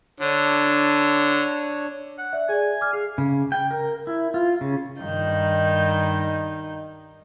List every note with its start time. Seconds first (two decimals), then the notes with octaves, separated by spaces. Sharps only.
0.20 D3 D4 C#5
2.19 F#5
2.33 D5 E5
2.49 G#4 D5 G#5
2.81 D6 F6
2.93 G#4 F5
3.18 C#3
3.52 G5
3.71 A#4
4.07 E4
4.34 F4
4.61 C#3
5.01 G2 D#3 D#4 G6